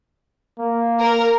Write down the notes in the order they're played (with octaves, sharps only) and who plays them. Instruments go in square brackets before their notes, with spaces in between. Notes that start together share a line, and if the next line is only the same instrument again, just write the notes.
[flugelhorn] A#3
[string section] A#4